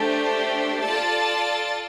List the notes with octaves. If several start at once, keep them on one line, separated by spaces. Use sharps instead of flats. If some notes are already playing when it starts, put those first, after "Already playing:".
Already playing: A3 D4 G4 C5
F4 A4 D5 A5